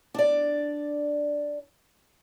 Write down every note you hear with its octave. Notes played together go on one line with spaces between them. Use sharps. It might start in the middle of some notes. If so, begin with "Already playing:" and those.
D4 D5